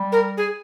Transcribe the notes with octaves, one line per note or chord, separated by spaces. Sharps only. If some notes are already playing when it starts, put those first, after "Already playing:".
Already playing: G3
A#4
G#4